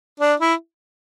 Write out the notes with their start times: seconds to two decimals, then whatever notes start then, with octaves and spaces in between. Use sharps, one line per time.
0.20 D4
0.40 E4